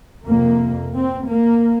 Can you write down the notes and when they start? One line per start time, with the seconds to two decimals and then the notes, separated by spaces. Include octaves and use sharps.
0.27 F2 C3 A#3
0.94 C4
1.28 A#3